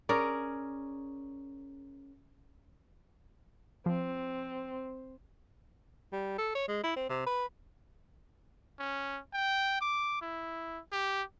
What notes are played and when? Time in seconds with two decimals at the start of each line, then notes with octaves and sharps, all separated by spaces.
0.09 C#4 G#4 A#4 D5
3.86 F3 C4
6.12 G3
6.39 A4
6.55 C#5
6.68 G#3
6.84 E4
6.96 C4
7.09 C3
7.27 B4
8.79 C#4
9.34 G5
9.81 D6
10.22 E4
10.92 G4